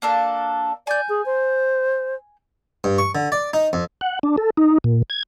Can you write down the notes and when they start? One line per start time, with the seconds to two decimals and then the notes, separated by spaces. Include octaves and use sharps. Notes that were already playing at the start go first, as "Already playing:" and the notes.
0.02 A#3 D4 A4
0.87 D5 G#5 G6
1.09 G#4
1.26 C5
2.84 G2
2.98 C#6
3.15 D3
3.32 D5
3.53 D#4
3.73 F2
4.01 F#5
4.23 D4
4.38 A4
4.57 D#4
4.84 A#2
5.10 G#6